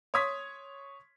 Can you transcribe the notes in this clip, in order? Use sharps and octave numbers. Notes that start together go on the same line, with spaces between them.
C#5 C6 D#6 G#6 B6